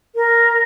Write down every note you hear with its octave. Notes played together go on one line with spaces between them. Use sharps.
A#4